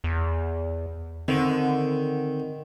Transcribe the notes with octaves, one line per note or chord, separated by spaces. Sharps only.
E2
D3 D#3 C4